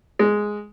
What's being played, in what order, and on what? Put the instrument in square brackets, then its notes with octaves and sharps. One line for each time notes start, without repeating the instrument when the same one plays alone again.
[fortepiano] G#3